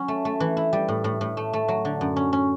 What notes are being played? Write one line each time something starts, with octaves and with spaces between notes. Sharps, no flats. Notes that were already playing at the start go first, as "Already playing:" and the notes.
Already playing: F#3 C#4
A3
A3
E3
E4
G3
A2
A2
A2
A3
A3
F#3
D3
F#2
C#4
C#4